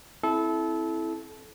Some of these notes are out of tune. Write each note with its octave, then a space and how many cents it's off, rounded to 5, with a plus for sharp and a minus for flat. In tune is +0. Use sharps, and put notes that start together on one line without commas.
C4 +15 E4 +0 A4 -25